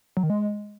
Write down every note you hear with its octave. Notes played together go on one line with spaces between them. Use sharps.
F#3
D#3
G#3